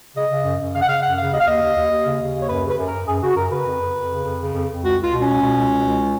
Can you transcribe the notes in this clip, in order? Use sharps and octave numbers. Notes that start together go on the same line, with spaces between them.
C#3 D#5
C#3
F#2
F#2
C#3 F5
F#5
C#3 F5
F#2 F#5
C#3 F5
D#2 D#5
F5
D#2 D#5
D#2
D#2
D#2
C#3
C#3
D#2
C#5
F#2 B4
C#3 B4
F#2
A#4
F#2
F#2 G#4
C#3 F#4
F#2 A#4
C#3 B4
F2
F2
F2
C#3
F2
C#3
F2
F2
C#2 F#4
C#2 F4
B2
C#4
C#2
B2
C#2
B2
C#2